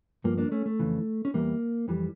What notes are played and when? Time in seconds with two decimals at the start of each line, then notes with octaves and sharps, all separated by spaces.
0.24 G2 F3 A#3
0.38 A#3 D4
0.52 A3 C#4
0.66 A3
0.79 F2 C#3 E3
1.25 C#4
1.34 E2 E3 G3 A#3
1.88 F2 E3 G3